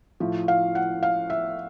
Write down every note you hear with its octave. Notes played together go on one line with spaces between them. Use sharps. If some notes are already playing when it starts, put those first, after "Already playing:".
A2 F3
F5
F#5
F5
E5